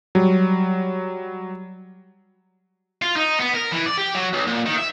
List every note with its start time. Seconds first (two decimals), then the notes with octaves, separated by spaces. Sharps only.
0.15 F#3 G3
3.02 F4
3.16 D#4
3.40 B3
3.54 A#4
3.72 E3
3.86 D5
3.97 G4
4.15 F#3
4.33 B1
4.47 A#2
4.66 D#3
4.78 E5